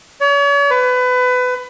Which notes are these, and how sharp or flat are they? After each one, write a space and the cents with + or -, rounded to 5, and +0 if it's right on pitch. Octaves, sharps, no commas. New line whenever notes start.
C#5 +40
B4 +25